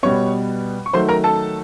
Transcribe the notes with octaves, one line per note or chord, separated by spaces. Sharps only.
B2 G3 B3 C#5 C#6
C#6
D#3 F#3 A3 C5 C6
A#4 A#5
A4 A5